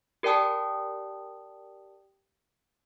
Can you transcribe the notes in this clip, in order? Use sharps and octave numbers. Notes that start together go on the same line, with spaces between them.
G4 A#4 D5 G5 A5 D#6